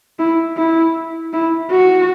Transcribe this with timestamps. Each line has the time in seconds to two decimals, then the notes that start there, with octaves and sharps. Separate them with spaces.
0.19 E4
0.57 E4
1.33 E4
1.71 F#4